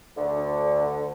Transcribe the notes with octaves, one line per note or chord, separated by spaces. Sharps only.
D2 D3